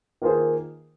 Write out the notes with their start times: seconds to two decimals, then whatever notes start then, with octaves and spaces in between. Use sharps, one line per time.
0.22 D#3 A#3 F4 G#4 C5